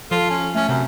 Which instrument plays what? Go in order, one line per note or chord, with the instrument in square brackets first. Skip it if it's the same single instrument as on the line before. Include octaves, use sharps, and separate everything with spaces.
[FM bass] F3 [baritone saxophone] F4 [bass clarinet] A4
[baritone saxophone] C#4
[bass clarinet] A3 [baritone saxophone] C#4
[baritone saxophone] F#2 [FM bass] C3